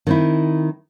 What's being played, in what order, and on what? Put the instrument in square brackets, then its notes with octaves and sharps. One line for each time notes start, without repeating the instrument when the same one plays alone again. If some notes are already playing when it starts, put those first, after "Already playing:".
[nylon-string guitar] D#3 C4 E4